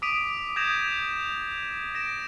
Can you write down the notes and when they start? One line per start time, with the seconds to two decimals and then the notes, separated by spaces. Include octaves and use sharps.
0.02 D6 D#6 B6 D7 D#7 F7
0.56 D#6 G6 G#6 A#6 E7 F7
1.95 A#6 D7 E7